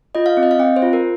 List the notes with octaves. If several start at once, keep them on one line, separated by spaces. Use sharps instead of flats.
F4 D#5
F5
C4
D#5
F5
C4 G5
C5
F4
A#4